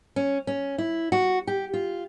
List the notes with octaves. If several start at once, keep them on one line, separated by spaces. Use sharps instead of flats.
C#4
C#4
E4
F#4
G4
F4